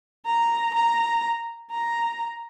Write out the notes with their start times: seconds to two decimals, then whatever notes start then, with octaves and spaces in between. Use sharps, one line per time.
0.26 A#5
0.74 A#5
1.71 A#5